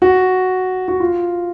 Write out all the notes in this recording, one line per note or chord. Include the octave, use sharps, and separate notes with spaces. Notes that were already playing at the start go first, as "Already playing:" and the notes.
F#4
F#4
F4